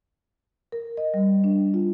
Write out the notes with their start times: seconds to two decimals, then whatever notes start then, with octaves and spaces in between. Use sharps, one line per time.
0.72 A#4
0.97 D#5
1.14 G3
1.44 D4
1.74 F4